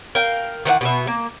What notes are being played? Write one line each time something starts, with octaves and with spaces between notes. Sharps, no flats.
A#4 F5 G5
D#3 E3 B4 F#5
B2 B3 E5
A#3